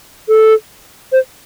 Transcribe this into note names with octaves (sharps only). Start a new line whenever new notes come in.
A4
C5